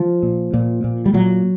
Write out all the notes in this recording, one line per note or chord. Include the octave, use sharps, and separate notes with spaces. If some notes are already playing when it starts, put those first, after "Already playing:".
Already playing: F3
A#2
A#2
A#2
G3
A#2 F#3